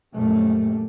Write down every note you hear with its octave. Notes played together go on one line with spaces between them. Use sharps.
A#1 F#2 G3 A3